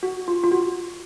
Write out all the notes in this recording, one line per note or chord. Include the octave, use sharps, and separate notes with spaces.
F#4
F4
F4
F#4